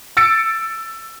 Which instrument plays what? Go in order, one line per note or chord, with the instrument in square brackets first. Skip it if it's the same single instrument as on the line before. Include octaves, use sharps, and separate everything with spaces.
[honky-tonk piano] E6 A6 C#7 D7